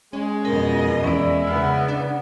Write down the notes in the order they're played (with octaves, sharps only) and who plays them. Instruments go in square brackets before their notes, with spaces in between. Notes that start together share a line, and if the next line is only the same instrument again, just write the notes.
[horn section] G#3 [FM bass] C#4
[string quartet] F2 B2 D#5 [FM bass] C#4 [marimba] A#4
[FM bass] E2 [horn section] G#3 E4 [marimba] C#4 D5
[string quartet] C#3 B3 [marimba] F6
[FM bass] D4